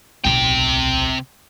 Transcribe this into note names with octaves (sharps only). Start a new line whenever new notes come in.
D1 B1 C3 G5